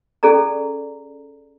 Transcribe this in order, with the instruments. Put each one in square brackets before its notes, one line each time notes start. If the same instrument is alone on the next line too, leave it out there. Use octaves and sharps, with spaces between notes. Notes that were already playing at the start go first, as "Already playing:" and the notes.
[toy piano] C#4 G#4 A4 D5 A#5